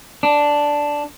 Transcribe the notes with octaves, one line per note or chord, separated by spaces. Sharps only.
D4